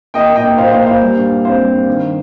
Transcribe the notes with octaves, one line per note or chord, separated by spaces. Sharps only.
A#3 D#5 G5
A#2
D#5 G5
A#3
A#2 C5 F5
A#3 C5 F5
A#2 C5 F5
G3
G2
G2
C4 C5 F5
G3
G2
D#3